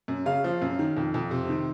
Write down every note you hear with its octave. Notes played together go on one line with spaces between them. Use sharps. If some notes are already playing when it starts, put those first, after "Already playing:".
F#2
C#3 F5
F3
F#2
D#3
F2
F2
C3
D#3